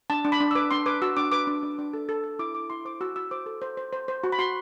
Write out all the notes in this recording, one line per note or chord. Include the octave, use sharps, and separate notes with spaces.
D4 A5
D4
B5
D4
E6
B4 D6
D4 C6
B4 D6
F#4 E6
D4 D6
B4 D6
D4
D4
D4
A4
A4
A4
E4 D6
A4 D6
E4 C6
C5 D6
F#4 E6
F#4 E6
C5 D6
A4
C5
C5
C5
C5
F#4
B5
F#4 C6